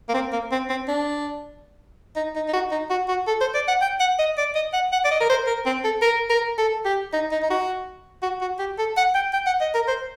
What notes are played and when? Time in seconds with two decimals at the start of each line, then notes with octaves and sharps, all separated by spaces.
0.09 A#3
0.14 C4
0.32 A#3
0.52 C4
0.69 C4
0.88 D4
2.16 D#4
2.35 D#4
2.48 D#4
2.53 F#4
2.71 D#4
2.90 F#4
3.08 F#4
3.27 A4
3.41 C5
3.54 D5
3.68 F#5
3.81 G5
4.00 F#5
4.19 D#5
4.38 D5
4.55 D#5
4.73 F#5
4.92 F#5
5.05 D5
5.11 D#5
5.20 A#4
5.29 C5
5.47 A#4
5.66 C4
5.84 A4
6.02 A#4
6.30 A#4
6.58 A4
6.85 G4
7.13 D#4
7.32 D#4
7.42 D#4
7.50 F#4
8.23 F#4
8.41 F#4
8.59 G4
8.78 A4
8.97 F#5
9.14 G5
9.33 G5
9.46 F#5
9.61 D#5
9.74 A#4
9.88 C5